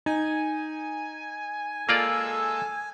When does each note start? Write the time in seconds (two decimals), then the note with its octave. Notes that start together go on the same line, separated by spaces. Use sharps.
0.06 D#4 G#5
1.89 G#3 A#3 F4 A4 D5 E6